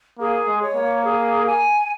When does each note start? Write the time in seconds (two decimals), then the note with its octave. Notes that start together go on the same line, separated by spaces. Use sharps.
0.19 A#3 G#4
0.47 G#3
0.61 C#5
0.75 A#3
1.04 G#4
1.45 G#5